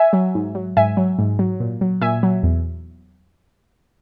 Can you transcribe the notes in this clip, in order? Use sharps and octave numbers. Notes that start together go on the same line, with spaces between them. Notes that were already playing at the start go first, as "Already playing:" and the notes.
Already playing: E5 G#5
F#3
G#2
F#3
G#2 E5 G#5
F#3
G#2
F#3
A#2
F#3
A#2 E5 G#5
F#3
E2